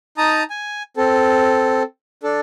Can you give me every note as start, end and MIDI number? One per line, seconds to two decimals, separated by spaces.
0.18 0.43 63
0.18 0.43 81
0.18 0.43 82
0.18 0.43 87
0.50 0.83 80
0.97 1.83 60
0.97 1.83 69
2.23 2.41 62
2.23 2.41 69